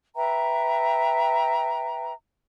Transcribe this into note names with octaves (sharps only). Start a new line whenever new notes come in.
B4 E5 G5 A#5